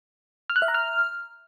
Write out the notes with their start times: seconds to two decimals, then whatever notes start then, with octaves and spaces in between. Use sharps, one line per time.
0.50 F6
0.56 F#6
0.62 E5
0.68 A#5
0.74 F6